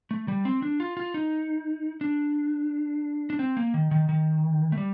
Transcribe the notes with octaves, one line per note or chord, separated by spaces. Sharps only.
A3
G3
C4
D4
F4
F4
D#4
D4
D4
C4
A#3
D#3
D#3
D#3
A3
G3